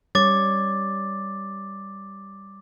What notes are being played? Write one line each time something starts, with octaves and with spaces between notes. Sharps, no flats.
G3 C#5 D6 A6